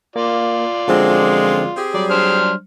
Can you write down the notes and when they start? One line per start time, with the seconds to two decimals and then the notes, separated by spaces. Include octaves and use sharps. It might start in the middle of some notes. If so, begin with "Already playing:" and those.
0.16 A#3 F4 D5
0.88 F#2 D3 F3 G#3 C4
1.77 C4 G4 G#4
1.94 F#3 G3 D5
2.11 D4 C5 F6